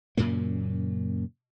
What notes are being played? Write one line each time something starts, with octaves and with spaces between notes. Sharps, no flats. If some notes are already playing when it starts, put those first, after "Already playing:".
F#2 A#2 C#3 A#3